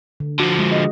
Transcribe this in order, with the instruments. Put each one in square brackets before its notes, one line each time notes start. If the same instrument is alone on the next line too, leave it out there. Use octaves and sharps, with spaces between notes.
[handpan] D3
[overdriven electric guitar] D3 F3 [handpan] F#4
[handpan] G#3
D#5